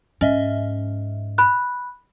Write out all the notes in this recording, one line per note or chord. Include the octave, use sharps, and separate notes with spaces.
G#2 C#4 D#5 E5
B5 F#6